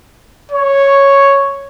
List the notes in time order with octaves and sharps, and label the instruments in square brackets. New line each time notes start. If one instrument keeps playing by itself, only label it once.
[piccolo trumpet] C#5